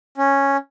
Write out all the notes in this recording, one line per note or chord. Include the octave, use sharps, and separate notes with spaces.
C#4